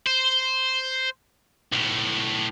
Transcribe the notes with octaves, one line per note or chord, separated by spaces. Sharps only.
C5
B1 A2